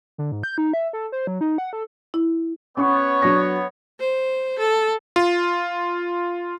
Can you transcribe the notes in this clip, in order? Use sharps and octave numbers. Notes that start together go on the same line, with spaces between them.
D3
G#2
G6
D#4
E5
A4
C5
F#3
D#4
F#5
A4
E4
B3 C#4 C#5 C#6
F#3 D4 A#6
C5
A4
F4